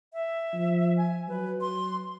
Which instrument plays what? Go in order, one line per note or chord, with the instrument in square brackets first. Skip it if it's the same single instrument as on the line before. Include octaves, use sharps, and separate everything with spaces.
[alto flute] E5
[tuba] F3
[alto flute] G#5
[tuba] F#3 [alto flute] B4
[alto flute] C6